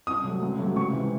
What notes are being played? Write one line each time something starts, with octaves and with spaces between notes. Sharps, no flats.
C2 D#6
C3 F#3 A3
C#2
C3 F#3 A3
C#2 C#6
C3 E3 G#3